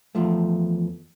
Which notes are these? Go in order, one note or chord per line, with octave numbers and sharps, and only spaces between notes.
E2 F3 A3